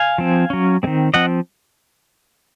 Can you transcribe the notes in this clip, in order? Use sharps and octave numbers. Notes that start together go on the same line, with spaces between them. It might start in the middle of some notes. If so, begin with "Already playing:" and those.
Already playing: F5 G#5
F3 C4
F#3 C#4
D#3 G#3 C4
F3 C4 D#5 F#5